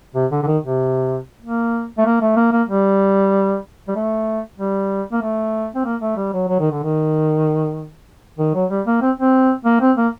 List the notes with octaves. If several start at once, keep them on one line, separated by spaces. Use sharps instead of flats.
C3
D3
D3
D#3
C3
A#3
A3
A#3
A3
A#3
A#3
G3
G3
A3
G3
A#3
A3
C4
A#3
A3
G3
F#3
F#3
D#3
D3
D#3
D#3
F#3
G3
A#3
C4
C4
A#3
C4
A#3